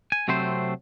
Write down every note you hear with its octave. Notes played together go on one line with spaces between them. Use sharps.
G#5
C3 F#3 A3 C4 C5